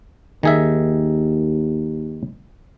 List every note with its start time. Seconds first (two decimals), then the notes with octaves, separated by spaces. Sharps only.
0.43 D#2 D#3 G#4 E5